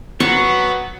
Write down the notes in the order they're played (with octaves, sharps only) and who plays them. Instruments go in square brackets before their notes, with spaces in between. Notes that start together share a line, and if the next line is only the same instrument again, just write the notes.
[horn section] F#3 F#5 [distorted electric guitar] B3 [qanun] C#6